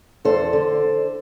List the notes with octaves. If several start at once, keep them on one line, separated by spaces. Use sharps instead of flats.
E2 A4 C5
D3